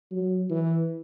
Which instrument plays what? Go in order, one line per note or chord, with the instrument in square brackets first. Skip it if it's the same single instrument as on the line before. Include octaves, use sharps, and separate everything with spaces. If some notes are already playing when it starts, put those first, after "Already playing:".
[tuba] F#3
E3